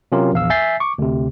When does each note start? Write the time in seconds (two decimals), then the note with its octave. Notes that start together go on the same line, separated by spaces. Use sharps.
0.12 C3 F#3 C#4 F4 G4 A#4
0.32 A#1 E2 F5 E6
0.50 E5 G#5 G6 A6 B6 C7
0.80 C#6 D6
0.98 D2 C3